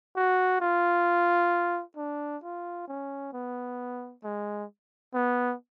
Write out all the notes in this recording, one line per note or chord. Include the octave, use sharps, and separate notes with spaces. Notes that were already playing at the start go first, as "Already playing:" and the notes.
F#4
F4
D4
F4
C#4
B3
G#3
B3